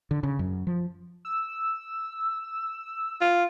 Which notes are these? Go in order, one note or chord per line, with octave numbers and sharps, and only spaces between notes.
D3
C#3
F#2
F3
E6
F4